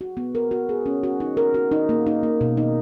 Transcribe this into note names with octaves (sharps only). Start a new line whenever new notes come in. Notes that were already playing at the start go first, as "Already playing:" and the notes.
F#4
B3
A#4
F#4
G#4
C#4
F#4
D#4
A#4
F#4
D#4
A#3
D#4
A#3
B2
D#4